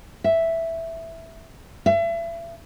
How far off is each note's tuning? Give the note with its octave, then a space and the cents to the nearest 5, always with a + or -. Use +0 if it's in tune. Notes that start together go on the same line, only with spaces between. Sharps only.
E5 +0
E5 +35